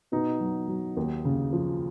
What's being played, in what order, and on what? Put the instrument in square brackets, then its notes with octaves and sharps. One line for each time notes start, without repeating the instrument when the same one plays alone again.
[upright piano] B2 D#4
F#3
F#3
D#2
C#3
F3